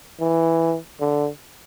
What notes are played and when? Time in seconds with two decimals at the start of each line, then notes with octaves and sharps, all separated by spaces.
0.20 E3
1.01 D3